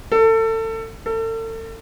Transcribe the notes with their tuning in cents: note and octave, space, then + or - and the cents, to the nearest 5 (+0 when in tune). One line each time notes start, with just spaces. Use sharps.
A4 +30
A4 +40